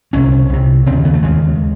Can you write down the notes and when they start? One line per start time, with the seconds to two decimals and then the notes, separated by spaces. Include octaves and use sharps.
0.13 C2 C3 C#4
0.50 C2 C3
0.86 C#3 C4
0.90 D#2
1.05 B3
1.14 A3
1.23 D#2 C#3 G#3